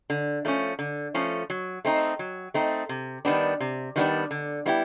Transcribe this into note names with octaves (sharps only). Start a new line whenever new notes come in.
D3
F3 A3 C#4
D3
F3 A3 C#4
F#3
A3 C4 D#4
F#3
A3 C4 D#4
C3
D#3 G3 B3 D4
C3
D#3 G3 B3 D4
D3
G3 B3 E4 G4